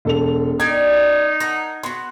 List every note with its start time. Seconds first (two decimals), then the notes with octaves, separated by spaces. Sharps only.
0.05 E1 A4 F7
0.60 D#4 G4 D5 G#6
1.40 A#4 F#5 A5
1.83 B3 F#4 C6